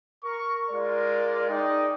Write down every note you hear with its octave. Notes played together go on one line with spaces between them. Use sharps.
A#4 C#6
G#3 F4 A#4 D5
D#4 G#4 D5 D#5 G5